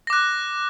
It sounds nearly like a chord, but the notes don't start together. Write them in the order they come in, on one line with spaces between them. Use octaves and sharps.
A#6 D6 F#6